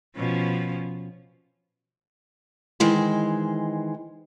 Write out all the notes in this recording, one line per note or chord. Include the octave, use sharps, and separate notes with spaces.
B2 F3 C#4
D#3 E3 G#3 C5